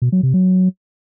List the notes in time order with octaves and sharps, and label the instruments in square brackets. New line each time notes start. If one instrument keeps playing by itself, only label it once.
[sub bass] B2
F#3
C3
F#3